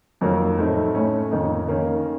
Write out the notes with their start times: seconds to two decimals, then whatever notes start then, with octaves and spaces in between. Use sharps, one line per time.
0.21 F2 D#3 F#3 A#3
0.58 A2 A3 C4 D#4
0.95 A2 A3 C#4
1.31 F2 D#3 A#3 D#4
1.68 D#3 A#3 C#4